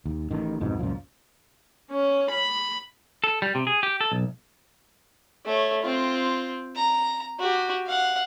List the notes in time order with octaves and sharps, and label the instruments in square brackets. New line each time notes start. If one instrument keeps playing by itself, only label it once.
[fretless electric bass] D#2
A1 D#3
C2 F2 G#2 B2
C#2 F#2 A#2 F3
[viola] C#4
B5
[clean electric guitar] A4
G3
C3
G#4
G4
A4
B1
[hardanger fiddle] A3 C#5
C4 F4
A#5
F#4 G4
F5 F#5